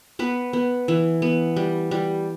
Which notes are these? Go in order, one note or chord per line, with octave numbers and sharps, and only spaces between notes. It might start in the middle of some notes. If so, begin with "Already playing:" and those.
B3 B4
B3
E3
B3
G3
G3